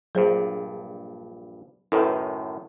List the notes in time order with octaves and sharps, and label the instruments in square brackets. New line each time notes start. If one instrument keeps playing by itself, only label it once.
[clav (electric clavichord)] A#1 G2 [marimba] F#3 G#4 C5
[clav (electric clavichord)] F#2 A2 D#3 [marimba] E4 A4 B4